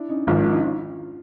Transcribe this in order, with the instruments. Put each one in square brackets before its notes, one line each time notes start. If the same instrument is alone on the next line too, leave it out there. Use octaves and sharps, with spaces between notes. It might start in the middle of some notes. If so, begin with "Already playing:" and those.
Already playing: [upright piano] D4 E4
C#4 D#4
[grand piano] G#1 G#2 F3 [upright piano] D#4 F4
[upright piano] D4 E4
C#4 D#4
D#4 F4